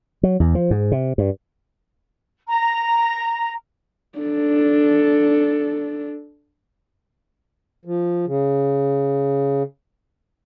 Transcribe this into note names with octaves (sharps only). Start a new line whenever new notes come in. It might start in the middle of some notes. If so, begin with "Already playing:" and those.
F#3
E2
F3
G#2
C3
G2
A#5
D4 A4
F3
C#3